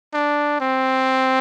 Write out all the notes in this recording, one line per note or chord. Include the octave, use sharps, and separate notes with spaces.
D4
C4